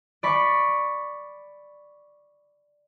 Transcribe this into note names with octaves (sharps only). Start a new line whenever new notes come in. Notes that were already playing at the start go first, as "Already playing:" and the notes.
D5 B5 C#6